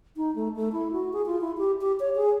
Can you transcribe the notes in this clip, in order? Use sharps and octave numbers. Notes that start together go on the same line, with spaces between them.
D#4
A3
A3
E4
F#4
G#4
F4
E4
G4
G4
C#5
G#4